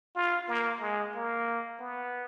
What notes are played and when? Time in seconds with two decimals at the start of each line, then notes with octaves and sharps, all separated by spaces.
0.15 F4
0.48 A#3
0.81 G#3
1.14 A#3
1.79 B3